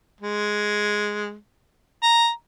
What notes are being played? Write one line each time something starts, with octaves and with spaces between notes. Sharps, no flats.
G#3
A#5